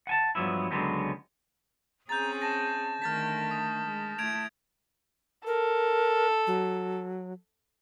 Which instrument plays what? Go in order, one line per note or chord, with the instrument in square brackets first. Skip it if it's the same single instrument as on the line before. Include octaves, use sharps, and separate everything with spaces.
[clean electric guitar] F#5 G#5 A5
G2 F3 F#3 B3 E4
C#2 D3 F#3 G#3 B3 C4
[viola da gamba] C4 C#4 G#4 [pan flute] A#5 [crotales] G6 A6
[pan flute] A5 [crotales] A6 A#6
[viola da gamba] D3 D#3 A3 [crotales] F6 A6 B6
[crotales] D#6
[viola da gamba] G#3
[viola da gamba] A3 E4 [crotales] G#6 D7 F7
[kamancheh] A4 [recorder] A#4
[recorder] F#3